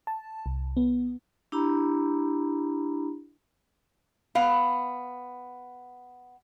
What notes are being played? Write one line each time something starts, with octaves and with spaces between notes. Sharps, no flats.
A5
C2
B3
D4 E4 G4 A#5 B5
B3 F5